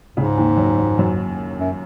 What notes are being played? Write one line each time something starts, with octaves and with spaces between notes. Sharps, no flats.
C#2 G#2 C#3
D#2 D#3
F#2 F#3
F#2 F#3
F#2 F#3
F#2